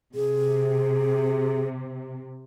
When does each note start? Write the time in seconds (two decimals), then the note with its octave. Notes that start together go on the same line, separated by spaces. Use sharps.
0.15 C3 G#4